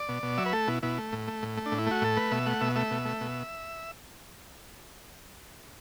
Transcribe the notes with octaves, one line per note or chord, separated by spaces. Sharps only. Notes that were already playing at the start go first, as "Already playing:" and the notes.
Already playing: D5
B2
B2
F#3 E5
B4
A3 A4
B2 E4
B2 E4
A3
A2
A3
A2
A3
D4
A2
E4
A3 F#4
A2 A4
A3 B4
B2 E5
A3 F#5
B2 E5
A3 E5
B2
A3
B2